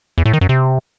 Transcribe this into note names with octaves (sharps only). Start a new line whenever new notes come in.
E2
A2
D#3
F#2
C3